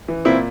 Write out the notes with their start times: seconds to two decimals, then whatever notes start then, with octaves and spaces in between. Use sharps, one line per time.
0.08 E3
0.25 A#2 C4 E4